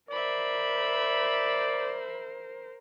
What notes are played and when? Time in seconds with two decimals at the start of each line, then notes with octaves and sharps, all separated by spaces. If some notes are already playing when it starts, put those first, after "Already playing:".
0.11 A#4 C5 D5 E5 B5